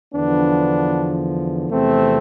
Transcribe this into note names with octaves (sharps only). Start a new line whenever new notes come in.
E2 D3 F3 B3 D4
E2 C3 F3 A3 C4